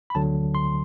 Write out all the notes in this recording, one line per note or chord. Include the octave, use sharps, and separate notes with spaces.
B5
D2 D3 F#3 A5
C6